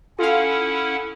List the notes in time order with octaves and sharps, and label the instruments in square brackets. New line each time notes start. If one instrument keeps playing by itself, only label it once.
[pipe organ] C#4 E4 F#5 [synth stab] F4 F5 [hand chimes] A4